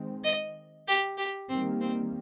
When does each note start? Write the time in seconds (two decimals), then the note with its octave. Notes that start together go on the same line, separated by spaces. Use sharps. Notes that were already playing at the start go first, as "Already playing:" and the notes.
Already playing: D#3 G#3 C4
0.24 D#5
0.87 G4
1.18 G4
1.49 D#3 G3 A#3 C4
1.81 C4